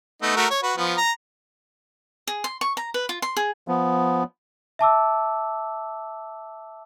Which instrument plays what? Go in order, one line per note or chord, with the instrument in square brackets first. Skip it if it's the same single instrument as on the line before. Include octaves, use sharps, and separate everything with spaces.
[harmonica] A3 B3 D#4
A3 F#4 A#4
C#5
F#4 B4
F3 B3
A#5
[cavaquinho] G#4
C6
C#6
A#5
B4
F4
C6
G#4
[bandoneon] F3 B3
[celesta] E5 A5 D6 E6